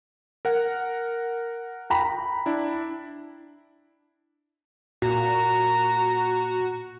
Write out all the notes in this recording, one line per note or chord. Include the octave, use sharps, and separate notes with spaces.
A#4 F#5
G5 A#5 B5
D4 E4
A#2 F#4 A#5